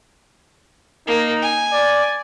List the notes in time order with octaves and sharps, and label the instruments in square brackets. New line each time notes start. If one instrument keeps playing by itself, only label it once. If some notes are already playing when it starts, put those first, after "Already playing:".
[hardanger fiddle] A#3 [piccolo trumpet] D#4
[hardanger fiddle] G#5
[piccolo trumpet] D5